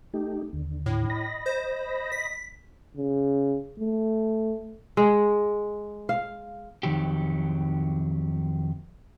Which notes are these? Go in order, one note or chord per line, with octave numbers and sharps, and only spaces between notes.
A3 D#4 G4
D#2 D3
A2
D#5 B5 A#6
C5
B6
C#3
A3
G#3
F5
F2 D#3 F#3 G4